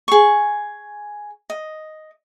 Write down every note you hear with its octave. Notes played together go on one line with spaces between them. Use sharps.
G#4 C#6
D#5